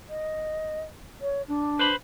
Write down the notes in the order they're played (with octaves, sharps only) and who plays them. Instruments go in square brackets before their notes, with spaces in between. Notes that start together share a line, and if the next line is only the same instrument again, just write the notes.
[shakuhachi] D#5
C#5
D4
[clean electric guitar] B4 C5 B5